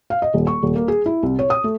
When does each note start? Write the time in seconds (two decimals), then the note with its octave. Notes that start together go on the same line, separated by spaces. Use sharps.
0.10 F5
0.22 D#5
0.34 D#1
0.47 C#6
0.63 D#1
0.76 A#3
0.88 G#4
1.06 E4
1.23 C2
1.39 C#5
1.50 D#6
1.64 A3